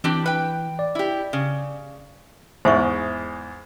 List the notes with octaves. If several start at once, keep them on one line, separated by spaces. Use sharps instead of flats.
E3 C4 D4 G4
B4 G5
D5
E4 G4
C#3
E2 G#2 C5 E5 C#6